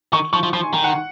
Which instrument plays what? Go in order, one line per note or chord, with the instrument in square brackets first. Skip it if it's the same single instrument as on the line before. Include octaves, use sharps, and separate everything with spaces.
[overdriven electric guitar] D#3 [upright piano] C#6
[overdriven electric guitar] F3 [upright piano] C#6
[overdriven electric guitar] F3
[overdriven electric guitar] F3 [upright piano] C6
[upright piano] G#5
[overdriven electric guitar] D#3
[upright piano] F#5